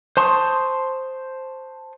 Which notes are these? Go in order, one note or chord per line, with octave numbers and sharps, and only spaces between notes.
C5 A5 C6 C#6 D#6